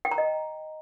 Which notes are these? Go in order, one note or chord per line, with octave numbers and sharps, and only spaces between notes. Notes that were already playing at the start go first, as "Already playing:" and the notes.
G5
A#5
D#5